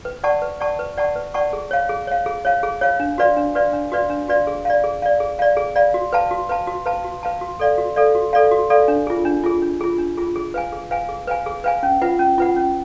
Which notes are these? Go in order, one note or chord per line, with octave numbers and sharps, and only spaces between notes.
B4
D5 F#5 A5 C#6
B4
D5 F#5 A5 C#6
B4
D5 F#5 A5 C#6
B4
D5 F#5 A5 C#6
G#4
C#5 F5
G#4
C#5 F5
G#4
C#5 F5
G#4
C#5 F5
D4
F#4 B4 D5 F5
D4
F#4 B4 D5 F5
D4
F#4 B4 D5 F5
D4
F#4 B4 D5 F5
G#4
D5 F5
G#4
D5 F5
G#4
D5 F5
G#4
D5 F5
F#4
B4 F5 A5
F#4
B4 F5 A5
F#4
B4 F5 A5
F#4
B4 F5 A5
F#4
A4 D5 F5
F#4
A4 D5 F5
F#4
A4 D5 F5
F#4
A4 D5 F5
D4
F4 G#4
D4
F4 G#4
D4
F4 G#4
D4
F4 G#4
G#4
B4 F5 G#5
G#4
B4 F5 G#5
G#4
B4 F5 G#5
G#4
B4 F5 G#5
C#4
F4 B4 F#5
C#4
F4 B4 F#5
C#4